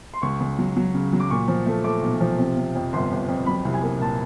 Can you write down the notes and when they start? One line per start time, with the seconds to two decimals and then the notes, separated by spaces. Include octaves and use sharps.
0.14 C6
0.22 C#2 C#6
0.40 C#2
0.58 F#3
0.76 F#3
0.94 C#3
1.13 F#3
1.20 D6
1.30 A#2 C#6
1.48 F3
1.66 A3
1.84 A3 D6
2.02 B1
2.21 F3
2.39 C3
2.57 C3
2.75 F2
2.93 G1 C6
3.11 G1
3.28 F2
3.46 F#3 B5
3.65 C2
3.74 G#5
3.82 A#3
4.00 A#2 A5